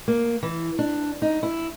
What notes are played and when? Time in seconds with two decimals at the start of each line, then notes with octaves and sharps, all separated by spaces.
0.08 A#3
0.43 E3
0.79 D4
1.22 D#4
1.43 E4